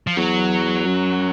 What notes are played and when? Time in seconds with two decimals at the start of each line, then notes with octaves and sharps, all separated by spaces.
0.07 F3
0.17 E2 F#3
0.86 F#2